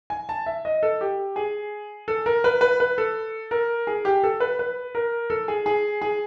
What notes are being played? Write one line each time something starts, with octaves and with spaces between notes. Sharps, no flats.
G#5
A5
E5
D#5
A4
G4
G#4
A4
A#4
B4
B4
B4
A4
A#4
G#4
G4
A4
B4
B4
A#4
A4
G#4
G#4
G#4